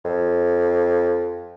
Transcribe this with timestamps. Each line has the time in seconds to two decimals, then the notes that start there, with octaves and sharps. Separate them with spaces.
0.04 F2